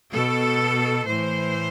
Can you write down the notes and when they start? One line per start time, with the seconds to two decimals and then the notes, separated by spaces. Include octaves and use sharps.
0.12 B2 A4
1.07 A2 E3 C5